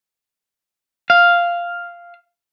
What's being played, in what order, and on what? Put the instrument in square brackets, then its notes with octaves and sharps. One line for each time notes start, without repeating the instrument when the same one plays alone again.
[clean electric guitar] F5